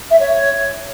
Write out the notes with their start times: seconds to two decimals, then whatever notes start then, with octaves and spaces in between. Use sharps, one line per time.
0.10 E5
0.20 C#5